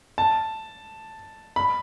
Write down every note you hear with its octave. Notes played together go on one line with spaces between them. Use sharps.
A5
B5